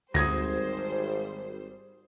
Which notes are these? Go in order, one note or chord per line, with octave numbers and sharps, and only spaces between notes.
G#1 D2 G3 C5 D#6 G#6 A#6